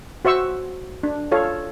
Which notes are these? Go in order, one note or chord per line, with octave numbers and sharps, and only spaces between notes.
F#4 C5 E5 C#6 E6
D4
F4 A4 C#5 F5